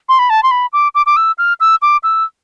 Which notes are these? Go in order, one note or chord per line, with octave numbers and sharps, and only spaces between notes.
C6
B5
A5
C6
B5
D6
D6
D6
E6
F6
E6
D6
E6